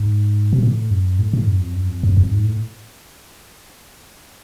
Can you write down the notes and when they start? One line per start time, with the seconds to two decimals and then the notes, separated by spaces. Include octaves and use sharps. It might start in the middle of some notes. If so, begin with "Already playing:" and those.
Already playing: G#2
0.53 B2
0.63 A2
0.91 F#2
1.19 A2
1.33 A2
1.47 F#2
1.61 F2
1.75 F#2
1.89 F2
2.03 F#2
2.17 F2
2.31 G#2
2.44 A2